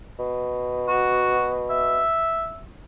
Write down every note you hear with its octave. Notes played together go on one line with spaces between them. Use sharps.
B2
F#4
E5